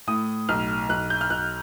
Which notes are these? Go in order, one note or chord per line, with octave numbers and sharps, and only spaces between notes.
A2 D#6
B1 F6
B1 F#6
G6
F6
B1 F#6